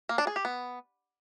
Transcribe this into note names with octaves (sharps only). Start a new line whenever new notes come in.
A#3
D4
G#4
G4
B3